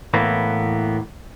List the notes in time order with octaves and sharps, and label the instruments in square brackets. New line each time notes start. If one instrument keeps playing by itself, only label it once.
[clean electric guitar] A2 E3 A#3 B3